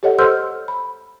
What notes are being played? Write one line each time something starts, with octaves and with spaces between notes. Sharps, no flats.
G4 A4 C#5 D#5 F#5
A4 C5 C6 E6 F6 G6
B5